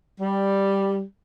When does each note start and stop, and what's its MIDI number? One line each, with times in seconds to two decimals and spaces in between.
0.20 1.02 55